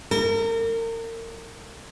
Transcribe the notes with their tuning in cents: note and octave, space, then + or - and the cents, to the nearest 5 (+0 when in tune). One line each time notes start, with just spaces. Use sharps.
A#4 -35